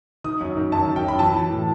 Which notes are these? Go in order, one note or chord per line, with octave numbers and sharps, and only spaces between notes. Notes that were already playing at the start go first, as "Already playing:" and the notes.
D#3 D#6
F#2
D#3
F#2 A5
D#3
G5
F#2 B5
E3 A5
E3
A2